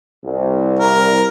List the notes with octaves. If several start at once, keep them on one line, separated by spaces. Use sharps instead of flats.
C2
A#4